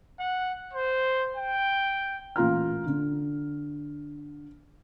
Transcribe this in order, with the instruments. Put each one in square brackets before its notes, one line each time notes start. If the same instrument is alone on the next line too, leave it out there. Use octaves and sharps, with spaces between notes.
[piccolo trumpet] F#5
C5
G5
[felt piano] A1 A#2 F4 A#5 F6
D3